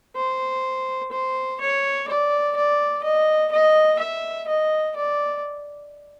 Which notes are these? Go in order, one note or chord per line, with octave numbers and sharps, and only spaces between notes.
C5
C5
C#5
D5
D5
D#5
D#5
E5
D#5
D5